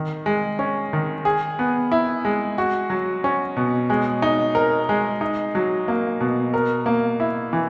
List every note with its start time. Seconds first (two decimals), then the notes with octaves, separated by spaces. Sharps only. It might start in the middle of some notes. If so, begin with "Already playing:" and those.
Already playing: D#3
0.26 G#3
0.59 C#4
0.93 D#3
1.25 G#4
1.59 B3
1.92 E4
2.25 G#3
2.58 F#4
2.90 F#3
3.24 C#4
3.57 B2
3.90 G#3
4.22 D#4
4.55 A#4
4.89 G#3
5.21 D#4
5.55 F#3
5.88 A#3
6.21 B2
6.54 A#4
6.86 A#3
7.20 E4
7.53 E3